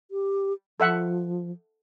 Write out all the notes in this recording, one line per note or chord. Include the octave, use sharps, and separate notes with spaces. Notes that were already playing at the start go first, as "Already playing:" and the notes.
G4
F3 A4 E5 F#5